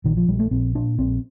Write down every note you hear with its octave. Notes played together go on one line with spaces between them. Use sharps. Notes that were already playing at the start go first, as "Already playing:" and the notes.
A#1 D#3
F3
A#1 G3
A3
A#1 C4
A#2 D4
A#1 C4